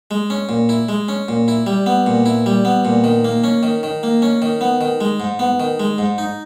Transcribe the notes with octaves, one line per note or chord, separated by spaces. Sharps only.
G#3
C#4
A#2
E4
G#3
C#4
A#2
E4
G3
B3
A#2
E4
G3
B3
A#2
D#3
A#3
C#4
D#3
D#3
A#3
C#4
D#3
B3
D#3
G#3
G#2
B3
D#3
G#3
G#2
D#4